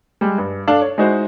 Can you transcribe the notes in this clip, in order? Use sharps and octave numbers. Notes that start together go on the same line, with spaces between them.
G3 G#3
G2
D4 A4 F5
C#5
G#3 D#4 E4 F#4 C5